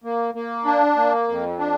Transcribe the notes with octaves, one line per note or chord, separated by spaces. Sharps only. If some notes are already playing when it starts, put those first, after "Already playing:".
A#3
A#3
D4
A#3
F2
D4